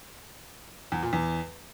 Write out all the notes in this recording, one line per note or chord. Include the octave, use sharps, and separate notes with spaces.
E2
A#2
E2